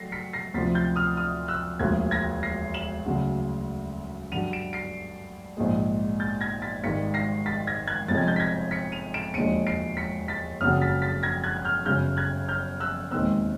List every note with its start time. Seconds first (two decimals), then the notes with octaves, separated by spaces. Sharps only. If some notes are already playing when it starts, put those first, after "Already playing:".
Already playing: F#3 A3 A#6 C7
0.12 B6 C#7
0.33 A#6 C7
0.54 D2 C3 F3 A6 B6
0.75 G6 A6
0.96 D#6 F6
1.17 D#6 F6
1.48 E6 F#6
1.80 E1 D2 D3 F3 A#3 F#6 G#6
2.11 G#6 A#6
2.43 A#6 C7
2.74 E7 F#7
3.05 D2 C#3 F#3
4.32 G2 D3 F#3 D#7 F7
4.53 D7 E7
4.73 C7 D7
5.57 A#1 G#2 F3 G#3
6.20 G6 A6
6.41 G#6 A#6
6.62 A6 B6
6.83 G#1 G#2 D#3 G3 B6 C#7
7.14 A#6 C7
7.46 A6 B6
7.67 G#6 A#6
7.87 F#6 G#6
8.08 G1 F2 C3 F3 G#3 A6
8.18 G#6
8.27 G6 A6
8.36 B6
8.40 G#6 A#6
8.71 B6 C#7
8.92 D#7 F7
9.14 D7 E7
9.34 E1 D#2 D3 F3 G#3 C#7 D#7
9.67 C7 D7
9.97 B6 C#7
10.28 A6 B6
10.61 F#1 F2 C#3 F#3 D#6 F6
10.81 A6 B6
11.02 A6 B6
11.23 G#6 A#6
11.44 F#6 G#6
11.57 F#6
11.65 F6 G6
11.85 G1 F#2 C#3 F6 G6
12.17 F#6 G#6
12.48 F6 G6
12.80 E6 F#6
13.11 E1 D#2 D#3 G#3 C4 E6 F#6